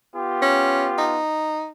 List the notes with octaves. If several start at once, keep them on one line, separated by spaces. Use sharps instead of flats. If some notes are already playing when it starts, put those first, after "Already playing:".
B3 F4 G4
C#4
D#4